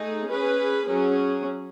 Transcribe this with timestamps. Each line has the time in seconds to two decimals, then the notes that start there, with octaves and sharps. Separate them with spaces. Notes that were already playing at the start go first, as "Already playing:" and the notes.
Already playing: A3 D#4 G#4
0.29 C#4 G#4 B4
0.87 F#3 C#4 G#4